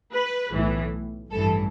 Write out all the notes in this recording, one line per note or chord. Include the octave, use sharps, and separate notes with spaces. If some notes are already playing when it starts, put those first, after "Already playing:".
B4
B1 A2 E3
A1 G2 E3 A4